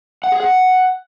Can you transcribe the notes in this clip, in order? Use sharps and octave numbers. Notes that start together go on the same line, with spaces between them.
F#5
G#4
F#5